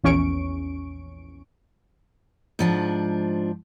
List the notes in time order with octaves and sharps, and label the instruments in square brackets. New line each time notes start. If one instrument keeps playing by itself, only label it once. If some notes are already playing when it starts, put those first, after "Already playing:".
[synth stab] A#1 E2 C#4 C#6 D7
[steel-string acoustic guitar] G#2 F3 D4